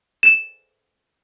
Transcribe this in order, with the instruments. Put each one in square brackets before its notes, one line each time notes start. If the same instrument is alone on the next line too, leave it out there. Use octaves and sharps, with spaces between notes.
[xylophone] E7